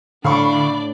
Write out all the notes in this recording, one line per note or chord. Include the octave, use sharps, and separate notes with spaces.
A2 D3 D4 D5 F5 B5 C#6